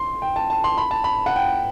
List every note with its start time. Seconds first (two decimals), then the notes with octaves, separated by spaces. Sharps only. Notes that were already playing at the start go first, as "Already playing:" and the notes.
Already playing: C6
0.22 G5
0.36 A5
0.50 A5
0.64 C6
0.78 B5
0.91 A5
1.04 B5
1.26 F#5
1.36 G5